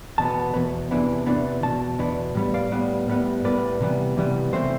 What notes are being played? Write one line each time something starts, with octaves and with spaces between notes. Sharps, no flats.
E2 B2 B3 A5
E2 B2 B3
E2 C3 E3 B3 D4
E2 C3 E3 B3 D4
E2 B2 A5
E2 B2 B3 D4
A2 G3 B3
D5 F5
A2 G3 B3
A2 G3 B3
A2 G3 B3 B4 D5
C3 E3 G3 B3
C3 E3 G3 B3
C3 E3 A3 C4 C5 E5